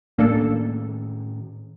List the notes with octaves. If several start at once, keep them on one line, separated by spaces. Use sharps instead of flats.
A2 D#3 A#3 C#4 D4 A4